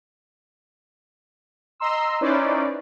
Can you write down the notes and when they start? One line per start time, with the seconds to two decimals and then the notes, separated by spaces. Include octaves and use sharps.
1.80 D#5 A#5 C6 E6
2.21 C#4 D#4 E4 B4 C5 D5